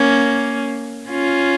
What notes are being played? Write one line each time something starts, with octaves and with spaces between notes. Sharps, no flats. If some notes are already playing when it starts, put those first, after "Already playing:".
Already playing: A#3 C#4
C#4 F4